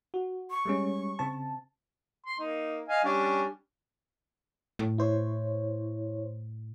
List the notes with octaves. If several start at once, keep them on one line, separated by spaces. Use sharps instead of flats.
F#4
C#6
G3 G#3 C#4
C#3 C4 A5
C6
A#3 D#4
D#5 F5 G#5
G3 C#4 D4
A2
E4 C5 C#5